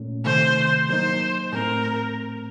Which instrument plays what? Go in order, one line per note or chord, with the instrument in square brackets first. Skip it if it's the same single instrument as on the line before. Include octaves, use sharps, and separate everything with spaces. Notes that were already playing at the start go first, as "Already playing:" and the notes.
Already playing: [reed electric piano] A#2 A3 C#4
[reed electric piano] C3 D#3 A3 [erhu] C5
[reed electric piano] F#3 A#3 D#4 [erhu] C5
[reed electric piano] A2 A3 C4 [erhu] A#4